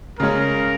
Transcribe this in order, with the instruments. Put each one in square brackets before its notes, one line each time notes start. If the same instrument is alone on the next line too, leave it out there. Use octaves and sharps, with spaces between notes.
[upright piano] C#3 G#3 C#4 [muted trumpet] A#4